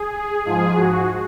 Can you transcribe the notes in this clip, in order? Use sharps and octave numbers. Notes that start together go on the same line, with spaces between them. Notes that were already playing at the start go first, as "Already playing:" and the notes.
Already playing: G#4
G#2 F3 G#4
F#4